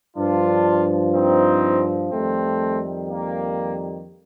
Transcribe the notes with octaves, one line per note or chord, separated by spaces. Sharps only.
G2 F3 D4 F4
C4 D#4
F2 D#3 G3 A3 C4
A#3